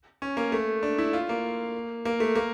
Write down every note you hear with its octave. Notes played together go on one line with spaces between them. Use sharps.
C#4
A#3
A3
D4
E4
F4
A#3
A#3
A3
A#3